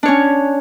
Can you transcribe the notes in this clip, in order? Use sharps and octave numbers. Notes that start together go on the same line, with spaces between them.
C#4 D4 C#5